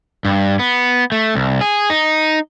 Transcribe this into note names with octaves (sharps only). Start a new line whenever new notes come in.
G2
B3
A3
C2
G#4
D#4